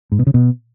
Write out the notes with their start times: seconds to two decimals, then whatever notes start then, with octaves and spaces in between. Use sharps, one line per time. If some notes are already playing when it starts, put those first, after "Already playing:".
0.12 G#2
0.19 B2
0.27 C#3
0.34 B2